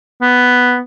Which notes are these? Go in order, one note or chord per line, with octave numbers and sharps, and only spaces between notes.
B3